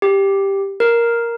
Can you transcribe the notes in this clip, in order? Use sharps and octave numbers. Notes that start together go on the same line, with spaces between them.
G4
A#4